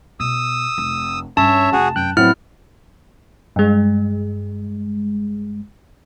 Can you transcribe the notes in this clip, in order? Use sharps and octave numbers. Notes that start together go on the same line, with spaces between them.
B2 D#6 E6
F1
G2 C#4 C#5 E5 A5
F1 F#4 G#4
F#2 G5 F#6
A2 F3 F#3 B3 C4 E4 F6
G2 G#3